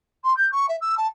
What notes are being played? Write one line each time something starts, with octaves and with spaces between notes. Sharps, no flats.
C6
G6
C#6
E5
E6
A5